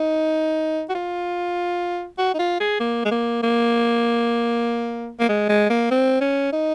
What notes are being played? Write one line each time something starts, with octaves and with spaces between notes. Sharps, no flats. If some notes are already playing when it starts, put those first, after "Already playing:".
Already playing: D#4
F#4
F4
F#4
D#4
F4
G#4
A#3
G#3
A#3
A#3
A#3
G#3
G#3
A#3
C4
C#4
D#4